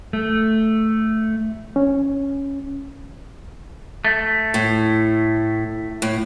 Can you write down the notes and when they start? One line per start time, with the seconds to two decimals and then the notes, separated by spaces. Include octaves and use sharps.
0.13 A3
1.76 C#4
4.05 A3
4.54 A2
6.02 A2